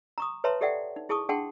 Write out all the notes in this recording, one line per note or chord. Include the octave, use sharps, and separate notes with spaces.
A#5 C#6 D#6
B4 C#5 E5 A5 A#5 C6
G4 A4 D5 E5 F#5 G5
D#4
E4 G#4 A5 C#6 D#6
D4 G#4 F#5 G5 A5 C6